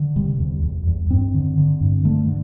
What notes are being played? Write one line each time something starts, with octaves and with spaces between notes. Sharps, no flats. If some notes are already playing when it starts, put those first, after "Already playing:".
Already playing: D3
C3 G3
E2
E2
E2
G2 C4
D3
D3
G2
D3 A3
D3